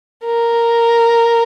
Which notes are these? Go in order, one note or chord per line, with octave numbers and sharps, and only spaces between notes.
A#4